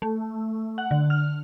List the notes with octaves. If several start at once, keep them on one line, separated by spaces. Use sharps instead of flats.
A3
F#5
D3
F6